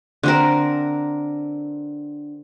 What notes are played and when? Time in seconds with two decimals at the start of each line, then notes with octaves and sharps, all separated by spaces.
0.23 D3 C4 A#4